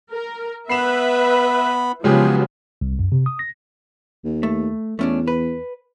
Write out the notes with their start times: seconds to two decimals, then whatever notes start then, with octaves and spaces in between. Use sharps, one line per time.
0.12 A#4
0.69 B3 B4 E5 B5 C7 E7
2.04 C#3 F3 F#3 G#3 B3 G4 G#4
2.81 C2
2.99 F#2
3.12 C3
3.26 D#6
3.39 A#6
4.25 D#2
4.43 A3
4.99 E2 A3 C#4 D4
5.28 B4